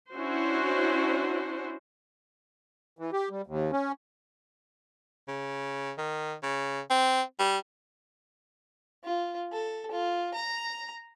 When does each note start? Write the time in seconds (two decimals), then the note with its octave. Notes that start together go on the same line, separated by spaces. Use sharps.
0.14 C#4 D4 E4 F#4 C5
2.99 E3
3.13 G4
3.30 G3
3.47 D#2
3.72 C#4
5.28 C#3
5.98 D#3
6.43 C#3
6.90 C4
7.39 G3
9.04 F4
9.52 A4
9.91 F4
10.34 A#5